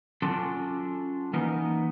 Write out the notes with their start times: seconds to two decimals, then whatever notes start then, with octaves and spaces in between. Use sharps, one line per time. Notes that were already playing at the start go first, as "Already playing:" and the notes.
0.22 F#3 C#4 D4 F4 A4
1.33 E3 A#3 B3 D#4 A#4